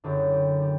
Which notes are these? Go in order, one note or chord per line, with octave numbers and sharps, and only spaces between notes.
F#1 F#2 D3 G4
G4
G4